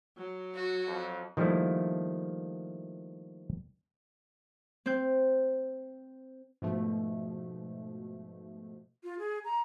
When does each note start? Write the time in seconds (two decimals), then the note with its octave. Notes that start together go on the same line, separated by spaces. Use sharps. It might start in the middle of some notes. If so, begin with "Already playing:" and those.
0.17 F#3
0.55 F#4
0.87 F2
1.37 D#3 F3 G3 A3 A#3 E4
4.86 C4 G6
6.62 G#2 B2 F3 A3
9.04 F4
9.19 G#4
9.45 A#5